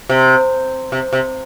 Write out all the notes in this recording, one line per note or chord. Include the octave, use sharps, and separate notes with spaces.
C3
C3
C3